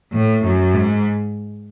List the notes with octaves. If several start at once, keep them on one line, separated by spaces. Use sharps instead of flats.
A2
F#2
G#2